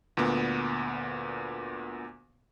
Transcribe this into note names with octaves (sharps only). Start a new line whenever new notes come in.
D2 A#2 B3